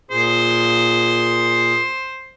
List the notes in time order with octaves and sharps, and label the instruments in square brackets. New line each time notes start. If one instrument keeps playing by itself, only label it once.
[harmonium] A#2 G#4 [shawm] C5